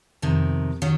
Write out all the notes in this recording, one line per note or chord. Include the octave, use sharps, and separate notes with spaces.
F2 C3 D#3
D#3 F#3 C#4